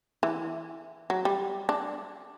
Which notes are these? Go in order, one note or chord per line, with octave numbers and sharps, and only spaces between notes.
E3
F#3
G3
D4